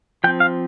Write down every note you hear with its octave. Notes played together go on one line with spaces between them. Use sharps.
F3 C4 G5
F5